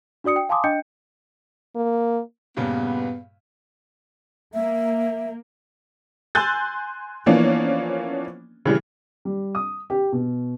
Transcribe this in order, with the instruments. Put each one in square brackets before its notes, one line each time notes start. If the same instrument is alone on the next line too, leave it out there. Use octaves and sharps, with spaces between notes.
[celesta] D4 F#4 D5 D#6 C#7
G5
F5 G#5 A5 C6 D6 D#6
D4 D#5 G5 G6 C#7
[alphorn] A#3
[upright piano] G2 A#2 C#3 [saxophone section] B3
[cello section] A#3 [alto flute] E5
[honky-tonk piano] G#5 C6 E6 F#6 G6 A6
E3 F3 A#3 B3 C#4 D4
C#3 E3 G3
[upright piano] G3
D#6
G4
B2